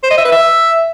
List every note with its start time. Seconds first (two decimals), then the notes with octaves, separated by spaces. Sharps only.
0.03 C5
0.10 D#5
0.17 E5
0.25 B4
0.32 E5